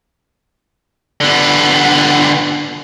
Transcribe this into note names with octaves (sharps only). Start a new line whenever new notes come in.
D3 B3